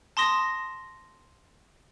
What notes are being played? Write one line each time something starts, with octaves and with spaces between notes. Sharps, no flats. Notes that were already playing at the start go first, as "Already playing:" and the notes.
A5 C6 D#6 A#6